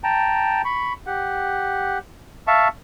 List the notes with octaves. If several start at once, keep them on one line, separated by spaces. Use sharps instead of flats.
G5 A5 A#5
B5 C#6
G4 F#5
E5 F5 A5 C#6